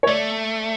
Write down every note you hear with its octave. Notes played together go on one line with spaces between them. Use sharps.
C#5
A3 D5